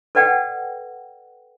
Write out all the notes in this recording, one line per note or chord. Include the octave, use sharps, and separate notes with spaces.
A4 B4 D5 F#5 G5